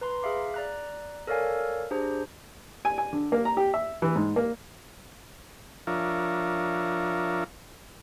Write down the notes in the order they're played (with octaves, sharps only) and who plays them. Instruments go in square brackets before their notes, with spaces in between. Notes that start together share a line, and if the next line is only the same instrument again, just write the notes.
[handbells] B4 A#5 C6
G#4 E5 F5 D6
D5 A#5 F#6
A4 A#4 C#5 D5 F5 G#5
D4 G4 G#4 C5 A#5
[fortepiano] G#5
G#5
D3
A#3
A#5
G4
E5
E3
G#2
A#3
[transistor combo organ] F3 D4 F4 A#4 C#5 E5